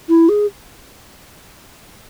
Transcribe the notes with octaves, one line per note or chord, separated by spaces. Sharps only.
E4
G#4